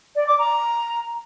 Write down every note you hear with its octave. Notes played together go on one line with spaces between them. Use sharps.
D5
D6
A#5